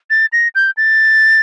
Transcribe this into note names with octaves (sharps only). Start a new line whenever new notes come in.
A6
A#6
G6
A6